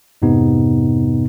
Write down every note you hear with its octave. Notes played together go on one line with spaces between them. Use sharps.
F2 G#2 C3 B3 D#4